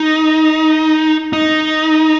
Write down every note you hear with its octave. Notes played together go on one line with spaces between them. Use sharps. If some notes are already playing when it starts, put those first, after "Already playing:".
Already playing: D#4
D#4